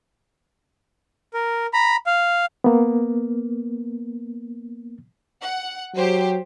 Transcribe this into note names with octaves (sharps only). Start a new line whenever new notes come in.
A#4
A#5 B5
F5
A#3 B3
F#5
F#3 G4 C5